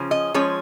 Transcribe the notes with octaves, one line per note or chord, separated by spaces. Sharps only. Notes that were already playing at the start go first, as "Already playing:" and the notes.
Already playing: C#3 F3 C#4
D#5
F3 G#3 C#4 C#5